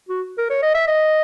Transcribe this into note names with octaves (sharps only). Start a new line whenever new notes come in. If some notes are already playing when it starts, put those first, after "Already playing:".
F#4
A#4
C#5
D#5
E5
D#5